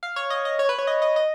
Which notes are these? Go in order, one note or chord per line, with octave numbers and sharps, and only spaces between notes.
F5
C#5
D#5
D#5
C#5
B4
C#5
D#5
D#5
D#5